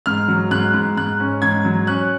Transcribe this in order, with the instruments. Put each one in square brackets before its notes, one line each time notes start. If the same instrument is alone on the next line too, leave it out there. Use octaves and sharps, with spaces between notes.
[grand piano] G#2 F6
F#3
G#2 F#6
G#2
G#2 F#6
C#4
G#2 G#6
F#3
C#4 F#6